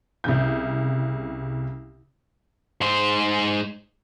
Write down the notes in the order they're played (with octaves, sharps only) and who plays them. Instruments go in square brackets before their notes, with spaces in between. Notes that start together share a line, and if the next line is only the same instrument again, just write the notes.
[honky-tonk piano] C2 C#3 G6
[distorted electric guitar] G#2 C5